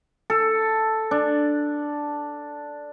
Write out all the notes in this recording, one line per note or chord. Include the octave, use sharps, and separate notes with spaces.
A4
D4